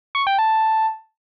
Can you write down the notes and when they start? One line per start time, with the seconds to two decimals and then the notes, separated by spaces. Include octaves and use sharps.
0.15 C#6
0.27 G5
0.39 A5